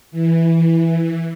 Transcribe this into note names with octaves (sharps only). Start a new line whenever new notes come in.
E3